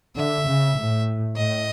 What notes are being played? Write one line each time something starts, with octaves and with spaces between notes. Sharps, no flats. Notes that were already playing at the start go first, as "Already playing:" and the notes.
D3 E5
C#3
A2
A2 D#5